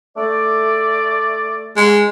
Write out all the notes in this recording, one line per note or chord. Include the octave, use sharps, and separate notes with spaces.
A3 D5
G#3